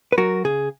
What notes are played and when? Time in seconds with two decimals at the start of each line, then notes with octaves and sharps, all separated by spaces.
0.12 B4
0.17 F#3 F#4 A#4
0.44 C#3 G#4